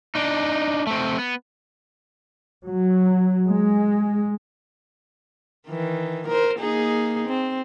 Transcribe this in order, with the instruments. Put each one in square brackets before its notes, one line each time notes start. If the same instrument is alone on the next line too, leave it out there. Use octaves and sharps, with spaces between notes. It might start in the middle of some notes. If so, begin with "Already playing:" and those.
[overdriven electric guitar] D4 D#4
A3 C4
B3
[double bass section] F#3
G#3
[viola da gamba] D#3 E3
A#4 C5
A#3 D#4 G#4
C4